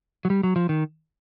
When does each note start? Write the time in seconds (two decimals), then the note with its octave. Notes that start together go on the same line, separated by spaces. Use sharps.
0.25 F#3
0.30 G3
0.43 F#3
0.56 F3
0.69 D#3